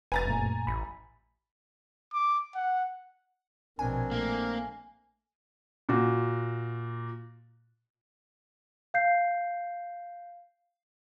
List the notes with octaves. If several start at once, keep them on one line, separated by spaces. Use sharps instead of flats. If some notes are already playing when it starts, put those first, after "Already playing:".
F1 B4 G#5 A#5 A6
F#2 A#2 A3
A1 B5
D6
F#5
A#1 B2 C4 D4 A#4 G#5
A3 A#3
A#2 F#4
F5 G6 C7